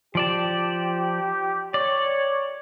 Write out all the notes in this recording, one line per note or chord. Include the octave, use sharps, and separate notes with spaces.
F3 G4 D5 A5
C#5 D5